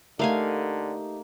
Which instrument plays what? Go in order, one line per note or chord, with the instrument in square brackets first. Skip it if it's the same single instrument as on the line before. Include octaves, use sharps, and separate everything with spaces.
[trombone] D3 [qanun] A3 F5 G#5 [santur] A#3 [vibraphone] D#4 G4 D#5